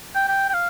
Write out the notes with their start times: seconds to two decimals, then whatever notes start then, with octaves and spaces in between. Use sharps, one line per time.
0.15 G5
0.28 G5
0.49 G5
0.54 F5